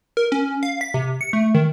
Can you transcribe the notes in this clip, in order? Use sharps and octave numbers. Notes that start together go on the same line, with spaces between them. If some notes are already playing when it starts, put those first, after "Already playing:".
A#4
C#4
F5
B6
C3
C#7
A3
D#3